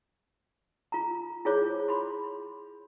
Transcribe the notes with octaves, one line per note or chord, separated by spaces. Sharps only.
F4 A#5
E4 F4 G#4 C5 C#5 D6
B5 C6